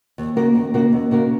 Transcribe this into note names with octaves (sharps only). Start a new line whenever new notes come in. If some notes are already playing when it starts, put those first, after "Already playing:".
D#2
C#3 A#3 F#4 A#4
D#2
C#3 A#3 F#4 A#4
D#2
C#3 A#3 F#4 A#4